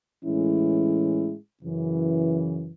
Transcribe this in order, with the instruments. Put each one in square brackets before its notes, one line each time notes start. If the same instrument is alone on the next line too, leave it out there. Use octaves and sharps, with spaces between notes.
[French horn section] A2 E3 G#3 C#4 E4
F#2 C#3 E3